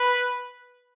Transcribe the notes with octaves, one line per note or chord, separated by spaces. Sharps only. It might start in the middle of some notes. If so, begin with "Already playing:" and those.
Already playing: B4